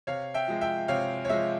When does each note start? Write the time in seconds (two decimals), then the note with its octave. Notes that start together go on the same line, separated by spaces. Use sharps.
0.07 C3 C#5 F5
0.34 E5 G5
0.48 F3 G#3
0.61 E5 G5
0.88 C3 C#5 F5
1.25 C#5
1.29 F3 G#3 E5